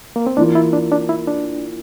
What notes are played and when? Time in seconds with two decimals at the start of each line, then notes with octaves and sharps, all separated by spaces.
0.16 A#3
0.27 C4
0.37 E3 A#3 D4 F4
0.55 E4
0.73 D4
0.92 D4
1.09 E4
1.28 D4